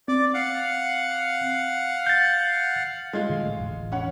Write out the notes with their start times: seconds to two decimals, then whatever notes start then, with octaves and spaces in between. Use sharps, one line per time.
0.08 C4 D5
0.34 F5 F#5
2.06 G6 A6
3.13 G#3 F4
3.30 D3 D#3 F#3
3.43 A1 A3
3.58 E1 A1
3.92 C#4 F#5